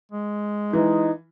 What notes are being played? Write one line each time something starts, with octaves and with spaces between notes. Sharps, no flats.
G#3
E3 D#4